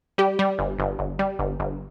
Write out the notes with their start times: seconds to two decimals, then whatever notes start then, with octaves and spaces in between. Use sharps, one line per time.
0.18 G3 G4
0.39 G3
0.59 G1
0.79 G1
0.99 G1
1.19 G3
1.39 G1
1.60 G1